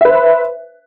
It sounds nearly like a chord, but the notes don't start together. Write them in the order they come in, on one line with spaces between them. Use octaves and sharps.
E5 B4 C5